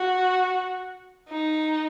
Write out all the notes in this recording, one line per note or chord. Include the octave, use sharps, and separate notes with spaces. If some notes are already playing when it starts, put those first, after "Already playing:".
Already playing: F#4
D#4